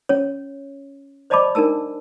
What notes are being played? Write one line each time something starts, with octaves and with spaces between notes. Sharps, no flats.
C#4 C#5
C5 D5 D#5 A5 B5 D6
D4 D#4 A#4 A5 E6